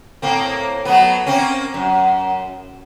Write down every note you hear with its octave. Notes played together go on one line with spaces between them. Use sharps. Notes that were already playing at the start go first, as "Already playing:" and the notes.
A2 A#3 C4
F#3 A3 B3
A#3 C4 C#4
F#2